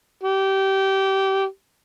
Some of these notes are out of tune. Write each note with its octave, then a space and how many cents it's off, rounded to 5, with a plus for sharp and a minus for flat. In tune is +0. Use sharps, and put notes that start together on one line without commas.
G4 -20